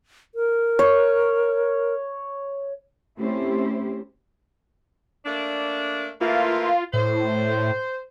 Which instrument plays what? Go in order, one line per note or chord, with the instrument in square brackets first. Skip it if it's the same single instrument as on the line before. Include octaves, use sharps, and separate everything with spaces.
[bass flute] A#4
[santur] C#5
[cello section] A3 C4 C#4 E4 G4 C5
[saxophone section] A3 A#3 D4
[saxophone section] E3 A3 A#3 [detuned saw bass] F4
[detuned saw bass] A2 [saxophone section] C5